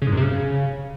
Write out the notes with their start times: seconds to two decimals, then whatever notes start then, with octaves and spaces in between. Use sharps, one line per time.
0.02 C#3
0.07 G#2
0.12 F#2
0.17 C3
0.22 C#3